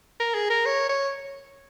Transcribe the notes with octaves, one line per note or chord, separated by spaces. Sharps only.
A#4
G#4
A#4
C#5
C#5